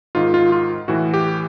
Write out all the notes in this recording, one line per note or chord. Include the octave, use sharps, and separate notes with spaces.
G#2 D#3 F4
F4
F4
A2 E3 F#4
G4